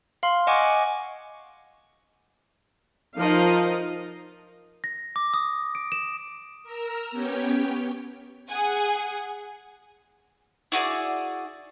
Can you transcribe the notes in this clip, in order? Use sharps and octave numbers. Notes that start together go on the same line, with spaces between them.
F5 C6
D#5 F#5 G#5 C#6 D6
F3 D#4 A#4 D#5 F5
A#6
D6
D#6
D7
E7
A#4 A#5 E6 F6
B3 C#4 G4 C#5 G5
G#4 F#5 G#5
E4 F#4 G#4 D5